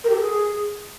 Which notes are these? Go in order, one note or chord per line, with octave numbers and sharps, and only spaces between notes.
A#4
G4
A4
G#4